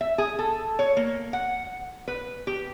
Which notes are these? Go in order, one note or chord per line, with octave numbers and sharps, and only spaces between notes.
E5
G#4
A4
C#5
A#3
F#5
B4
G4